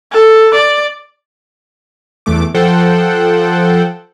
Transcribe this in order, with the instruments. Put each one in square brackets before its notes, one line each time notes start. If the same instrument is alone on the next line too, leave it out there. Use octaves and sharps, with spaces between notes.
[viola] A4
D5
[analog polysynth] E2 E3 A3 D6
F3 A4 C5 F#5 G5